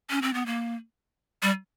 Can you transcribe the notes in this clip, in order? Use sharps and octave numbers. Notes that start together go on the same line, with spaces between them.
C#4
C4
B3
A#3
G3